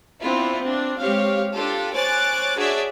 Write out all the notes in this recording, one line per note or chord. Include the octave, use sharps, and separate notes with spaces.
B3 C4 D4 E4 F4
C4 D4
G#3 C4 G4 C#5 F5
D4 F4 G4 A4
C5 C#5 G#5 D6 F#6 A6
D4 F#4 G#4 C#5 D5 E5